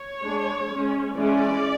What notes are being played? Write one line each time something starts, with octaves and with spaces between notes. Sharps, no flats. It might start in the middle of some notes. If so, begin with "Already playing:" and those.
Already playing: C#5
G#3 D4
G#3 C#4
E3 G#3 C#4 D5